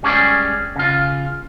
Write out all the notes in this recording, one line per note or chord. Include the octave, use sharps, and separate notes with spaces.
G3 G#3 C#4 G#4 D5
C#3 F4